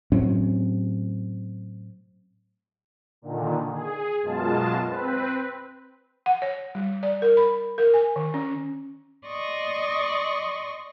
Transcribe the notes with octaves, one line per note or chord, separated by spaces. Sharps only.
A2 F#3 C4 C#4
A#2 D3 D#3
G#4
F#2 B2 G#3 F4 A5
C4 B4
F#5
C#5
G3
D5
A#4
B5
A#4
G#5
D#3
C#4
D5 D#5 C6 C#6 D#6